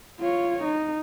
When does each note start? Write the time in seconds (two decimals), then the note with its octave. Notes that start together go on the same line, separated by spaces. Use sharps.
0.21 F4 C#5
0.64 D#4